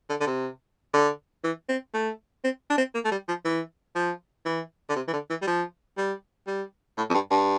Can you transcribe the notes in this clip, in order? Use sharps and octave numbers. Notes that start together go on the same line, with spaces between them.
D3
D3
C3
D3
E3
C4
A3
C4
D4
C4
A#3
A3
G3
F3
E3
F3
E3
D3
C3
E3
D3
E3
G3
F3
G3
G3
A2
F2
G2
G2